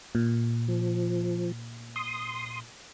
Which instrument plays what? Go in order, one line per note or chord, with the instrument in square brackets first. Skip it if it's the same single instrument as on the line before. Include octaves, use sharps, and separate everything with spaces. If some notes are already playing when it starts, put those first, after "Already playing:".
[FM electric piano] A#2
[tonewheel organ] F3
C6 D#6